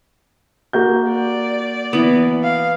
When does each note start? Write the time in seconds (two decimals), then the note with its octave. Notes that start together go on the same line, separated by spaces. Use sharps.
0.73 A#3 F#4 G6
1.10 D5
1.93 E3 B3
2.43 F5